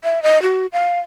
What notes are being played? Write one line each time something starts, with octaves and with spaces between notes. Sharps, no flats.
E5
D#5
F#4
F5